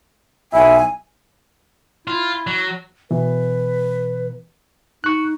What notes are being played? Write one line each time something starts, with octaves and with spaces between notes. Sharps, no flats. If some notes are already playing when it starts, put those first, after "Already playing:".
B1 E4 G#5
E4 F4
F#3
B2 E3 B4
D#4 C#6 F#6